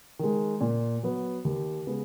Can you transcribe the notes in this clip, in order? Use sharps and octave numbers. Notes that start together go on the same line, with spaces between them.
D#3 G#3
A#2
F#3 B3
D#2
C#3 G#3 B3